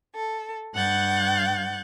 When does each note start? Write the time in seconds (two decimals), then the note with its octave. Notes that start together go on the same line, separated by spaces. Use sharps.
0.14 A4
0.74 G2 F#5 F#6 G6 A6